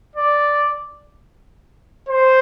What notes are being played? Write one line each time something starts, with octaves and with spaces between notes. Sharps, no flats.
D5
C5